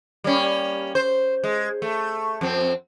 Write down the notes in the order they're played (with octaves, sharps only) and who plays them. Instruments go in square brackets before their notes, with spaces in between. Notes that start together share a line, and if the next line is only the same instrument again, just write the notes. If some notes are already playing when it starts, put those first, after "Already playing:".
[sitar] G3 A#3 C#4
C5
G#3
A3
F2 C4